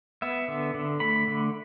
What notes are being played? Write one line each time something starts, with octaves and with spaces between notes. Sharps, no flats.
B3 E5
D3
D3
A3 B5
D3